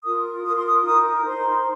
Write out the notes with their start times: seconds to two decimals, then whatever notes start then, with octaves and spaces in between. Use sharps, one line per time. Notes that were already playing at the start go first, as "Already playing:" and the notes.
0.03 F4 A#4 D#6
0.44 F4 A#4 D#6
0.55 C6
0.67 D#6
0.85 D#4 A#4 D#6
1.26 D#4 C5 C6